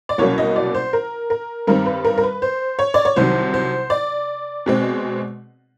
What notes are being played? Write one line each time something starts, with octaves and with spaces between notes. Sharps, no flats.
D5
C2 B2 F#3 A#3 C#4 C#5
D#5
D5
C5
A#4
A#4
G2 D#3 G3 C4 A#4
B4
A#4
A#4
B4
C5
C#5
D5
C#5
C2 C3 D#3 F#3 C5
C5
D5
B2 G#3 C4